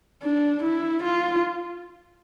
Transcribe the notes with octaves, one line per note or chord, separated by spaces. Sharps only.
D4
E4
F4